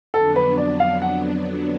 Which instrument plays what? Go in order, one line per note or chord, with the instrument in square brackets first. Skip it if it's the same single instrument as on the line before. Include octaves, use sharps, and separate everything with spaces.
[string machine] F2 D3 F#3 B3 D4 [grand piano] A4
[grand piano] B4
D5
F5
F#5